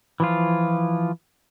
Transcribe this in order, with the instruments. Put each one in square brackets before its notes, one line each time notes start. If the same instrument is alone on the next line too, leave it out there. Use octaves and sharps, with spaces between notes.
[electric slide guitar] E3 F3 F4